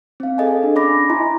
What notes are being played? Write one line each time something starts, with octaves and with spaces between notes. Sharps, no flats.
C4 F5
G#4 A4 D#5 G#5
D4
C#4 D5 B5 D6 A#6
E4 D#5 G#5 A#5 C6